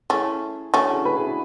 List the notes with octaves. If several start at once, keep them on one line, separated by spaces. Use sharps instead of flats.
A3 C#4 E4 G#4
A3 C#4 D4 F#4
E4 G#4
G#4 B4
E4 G#4
D4 F#4